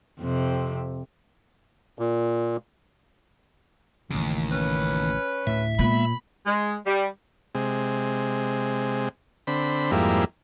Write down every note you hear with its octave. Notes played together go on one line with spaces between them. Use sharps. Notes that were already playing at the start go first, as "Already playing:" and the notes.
F2 C3
A#2
A1 D#2 C#3
C#4 B4
D2 A2 E5
A#2 G#3 A#3 B3 B5
G#3
G3
C3 G#3
D3 C4 B5
F2 G#2 G3 A#3 E4